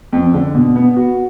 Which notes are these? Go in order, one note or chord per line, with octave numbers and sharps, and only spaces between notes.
F2
D3
B2
B3
F#4